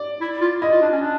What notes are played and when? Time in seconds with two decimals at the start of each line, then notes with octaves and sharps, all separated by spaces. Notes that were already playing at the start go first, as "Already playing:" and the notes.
Already playing: D5
0.21 E4
0.41 F4
0.61 E4 D#5
0.72 F4
0.82 D4
0.92 C#4
1.02 D4